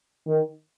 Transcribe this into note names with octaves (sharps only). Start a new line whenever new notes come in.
D#3